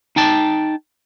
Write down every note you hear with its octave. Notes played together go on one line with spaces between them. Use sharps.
D#4 G5 A5